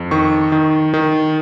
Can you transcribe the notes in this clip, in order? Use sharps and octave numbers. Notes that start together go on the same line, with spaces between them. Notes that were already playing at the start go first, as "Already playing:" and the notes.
Already playing: F2
D#3 C#6
D#3
D#3